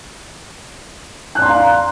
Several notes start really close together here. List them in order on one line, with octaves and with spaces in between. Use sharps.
F#6 D5 C6 A#5 F5